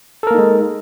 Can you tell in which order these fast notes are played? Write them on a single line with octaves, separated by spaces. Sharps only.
A4 A#4 A#3 D#4 G#3